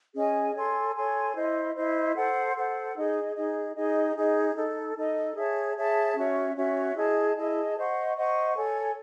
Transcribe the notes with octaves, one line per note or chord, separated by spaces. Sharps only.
C#4 G#4 D#5 G#5
A4 C#5 G#5 C6
A4 C#5 G#5 C6
E4 C5 D#5
E4 C5 D#5
A4 C5 F#5
A4 C5 F#5
D#4 G#4 D#5
D#4 G#4 D#5
D#4 G#4 D#5
D#4 G#4 D#5
D#4 A4 D#5
D#4 A4 D#5
G#4 C#5 E5 A5
G#4 C#5 E5 A5
C#4 F#4 C#5 E5
C#4 F#4 C#5 E5
E4 G#4 D#5 A5
E4 G#4 D#5 A5
C5 D#5 F#5 C#6
C5 D#5 F#5 C#6
A4 C#5 G#5